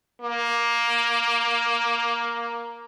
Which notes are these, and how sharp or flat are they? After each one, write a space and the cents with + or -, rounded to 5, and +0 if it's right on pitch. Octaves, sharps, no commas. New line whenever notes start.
A#3 +10